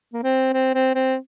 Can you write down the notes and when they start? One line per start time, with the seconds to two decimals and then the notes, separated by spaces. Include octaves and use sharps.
0.13 A#3
0.23 C4
0.53 C4
0.74 C4
0.95 C4